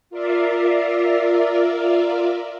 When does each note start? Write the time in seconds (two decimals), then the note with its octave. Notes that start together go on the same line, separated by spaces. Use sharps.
0.10 F4 A#4 D5 E5 F5